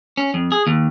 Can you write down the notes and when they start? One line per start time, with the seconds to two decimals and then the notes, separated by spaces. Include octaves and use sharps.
0.17 C#4
0.34 F2
0.52 G#4
0.67 D#2